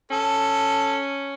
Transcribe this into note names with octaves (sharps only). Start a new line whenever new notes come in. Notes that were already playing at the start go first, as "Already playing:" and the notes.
C#4 A4